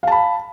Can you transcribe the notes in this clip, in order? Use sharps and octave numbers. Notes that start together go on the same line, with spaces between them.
F5 A5 B5